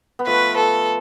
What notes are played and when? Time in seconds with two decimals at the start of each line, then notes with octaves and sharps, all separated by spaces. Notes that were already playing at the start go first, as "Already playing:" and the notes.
0.19 B3
0.27 F3 A3 B4
0.57 A4